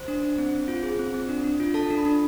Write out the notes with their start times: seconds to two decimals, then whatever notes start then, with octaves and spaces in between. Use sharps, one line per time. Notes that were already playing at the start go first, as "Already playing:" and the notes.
Already playing: C5
0.08 D4
0.23 D4
0.38 C4
0.53 C4
0.68 F4
0.83 G#4
0.99 C4
1.14 C4
1.29 D4
1.44 D4
1.60 F4
1.74 A4 A5
1.90 D4
1.98 B5
2.05 D4